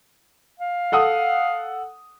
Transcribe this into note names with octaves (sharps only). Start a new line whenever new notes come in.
F5
A4 F#5 D#6